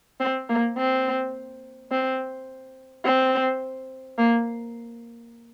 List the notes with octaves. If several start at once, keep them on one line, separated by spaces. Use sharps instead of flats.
C4
A#3
C4
C4
C4
A#3